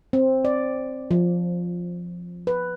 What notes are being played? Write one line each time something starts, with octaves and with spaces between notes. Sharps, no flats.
C4
D5
F3
B4